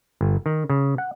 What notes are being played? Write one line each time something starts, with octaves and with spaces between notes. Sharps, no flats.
G1
D#3
C#3
F#5